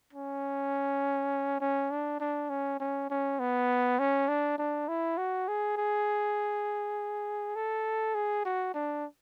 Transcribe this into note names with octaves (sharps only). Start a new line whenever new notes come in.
C#4
C#4
D4
D4
C#4
C#4
C#4
B3
C#4
D4
D4
E4
F#4
G#4
G#4
A4
G#4
F#4
D4